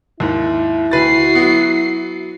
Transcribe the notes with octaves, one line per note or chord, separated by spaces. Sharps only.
D#2 G#2 E4
D2 F#4 B4 A6 C7
F#3 B3